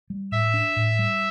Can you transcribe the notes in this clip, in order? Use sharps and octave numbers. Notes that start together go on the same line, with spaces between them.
G3
A2 E5
D4
A2
G3